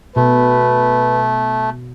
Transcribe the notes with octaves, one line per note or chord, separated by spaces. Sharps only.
B2 A3 B4